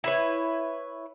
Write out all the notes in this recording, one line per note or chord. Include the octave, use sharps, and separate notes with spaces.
E4 B4 C#5